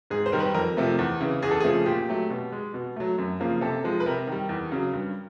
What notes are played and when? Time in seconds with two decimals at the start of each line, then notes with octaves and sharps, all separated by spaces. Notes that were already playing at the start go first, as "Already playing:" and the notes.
0.10 G#2 G#4
0.26 C5
0.32 D#3 G3 A#4
0.40 B4
0.54 F2 A#4
0.77 C3 F3 A3
0.99 E2
1.21 C#3 E3
1.42 E2 G#4
1.51 A4
1.60 C#3 F3 A3 G#4
1.86 A#2 G4
2.08 F#3 A3
2.30 B2
2.52 G#3
2.74 B2
2.96 F#3 A3
3.18 F#2
3.40 C#3 F3 A#3
3.61 C3 A4
3.84 F3 G#3
4.00 B4
4.06 C3 A#4
4.28 D#3 G3
4.49 E2
4.72 C#3 F#3
4.94 G2